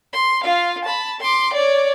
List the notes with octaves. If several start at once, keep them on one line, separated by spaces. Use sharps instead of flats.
C6
F4 F5
A5 B5
C6 D6
C#5 D5